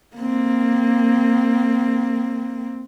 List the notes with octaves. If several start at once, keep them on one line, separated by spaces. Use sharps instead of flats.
A#3 C4